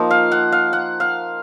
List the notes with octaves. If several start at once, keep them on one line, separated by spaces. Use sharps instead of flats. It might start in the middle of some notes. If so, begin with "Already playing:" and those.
Already playing: F3 A#3 D#4
F5
F#5
F5
F#5
F5